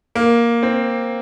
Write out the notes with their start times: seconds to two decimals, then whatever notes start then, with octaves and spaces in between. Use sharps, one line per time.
0.16 A#3
0.63 C4